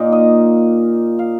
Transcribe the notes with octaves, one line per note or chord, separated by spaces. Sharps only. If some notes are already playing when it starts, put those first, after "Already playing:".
Already playing: A#2 A#3 D#4
D#5
F5